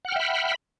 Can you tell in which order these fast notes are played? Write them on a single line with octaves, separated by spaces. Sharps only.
F#5 F6 G5 E5 B5